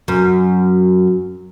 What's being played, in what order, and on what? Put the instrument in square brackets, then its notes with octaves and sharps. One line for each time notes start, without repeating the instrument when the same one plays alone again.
[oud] F#2